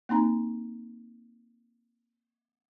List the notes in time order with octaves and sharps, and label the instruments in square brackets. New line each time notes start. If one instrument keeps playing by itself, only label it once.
[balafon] A#3 C4 D#4 A#5